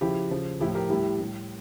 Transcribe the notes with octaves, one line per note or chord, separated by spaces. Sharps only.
C#3 F3 E4 G4
C#3 F3
A2 F3 E4 G4
G4 A#4
A2 G3 E4 G4
A2 G3